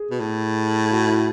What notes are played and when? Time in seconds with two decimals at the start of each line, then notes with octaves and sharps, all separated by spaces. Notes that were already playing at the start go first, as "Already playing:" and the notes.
Already playing: G#4
0.11 B2
0.20 A2
0.91 F#4
1.08 E4